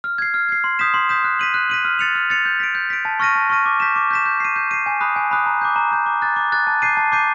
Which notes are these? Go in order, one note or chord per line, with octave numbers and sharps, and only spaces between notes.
F6
G#6 C7
F6
G#6 C7
C6
D#6 G6 B6 E7
C6
D#6 G6 B6 E7
F#6
B6 D#7 F#7
F#6
B6 D#7 F#7
F6
A6 C#7 F7
F6
A6 C#7 F7
G6
B6 D7
G6
B6 D7
A5
C#6 F6 A#6 D#7
A5
C#6 F6 A#6 D#7
D6
G6 B6 E7
D6
G6 B6 E7
G6
C7 D#7
G6
C7 D#7
G#5
B5 D#6 F#6
G#5
B5 D#6 F#6
A#5
D6 G6
A#5
D6 G6
D6
F#6 A6
D6
F#6 A6
A5
D6 G6 C7 D#7
A5
D6 G6 C7 D#7